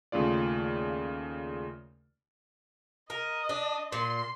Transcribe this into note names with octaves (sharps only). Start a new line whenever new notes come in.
D#2 C#3 A3 F4 D5
A#4 D#5
D4
A#2 C6